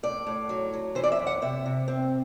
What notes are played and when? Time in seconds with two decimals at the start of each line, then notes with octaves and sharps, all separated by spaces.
0.03 A2 D5
0.27 A2
0.49 F#3
0.74 F#3
0.95 E3 C5
1.04 D5
1.12 E5
1.19 F#2
1.27 F#5
1.42 C3 E5
1.66 C3
1.88 C4